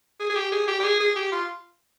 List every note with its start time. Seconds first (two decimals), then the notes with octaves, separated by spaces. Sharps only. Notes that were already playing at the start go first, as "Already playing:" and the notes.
0.20 G#4
0.30 G#4
0.36 G4
0.52 G#4
0.67 G4
0.80 G4
0.84 G#4
1.00 G#4
1.16 G4
1.32 F4